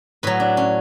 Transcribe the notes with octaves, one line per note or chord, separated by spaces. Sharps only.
A2 F#3 B4
D4
C#4